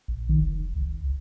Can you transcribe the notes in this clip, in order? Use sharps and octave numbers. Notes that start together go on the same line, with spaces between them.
A#1
D#3
F1
C#2